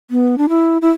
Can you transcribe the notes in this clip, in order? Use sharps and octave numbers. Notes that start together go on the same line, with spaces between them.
B3
D4
E4
E4